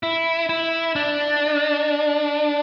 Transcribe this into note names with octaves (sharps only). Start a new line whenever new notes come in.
E4
E4
D4